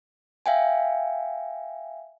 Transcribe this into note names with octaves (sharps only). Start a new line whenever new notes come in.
E5 F5 G5 G#5